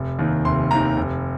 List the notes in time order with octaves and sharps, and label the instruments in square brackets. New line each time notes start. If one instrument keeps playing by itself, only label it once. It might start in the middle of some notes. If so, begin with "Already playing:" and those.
Already playing: [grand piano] F1
D#2 D#3
F1 C6
D#2 D#3 A#5
F1